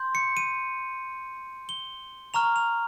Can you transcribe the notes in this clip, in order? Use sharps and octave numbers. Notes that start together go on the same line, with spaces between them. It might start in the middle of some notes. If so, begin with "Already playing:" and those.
Already playing: C6 G6
C#7
D#7
G7
A#5 C#6 F6 F7
F7